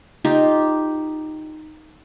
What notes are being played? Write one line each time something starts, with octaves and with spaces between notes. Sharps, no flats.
D#4 F4 G4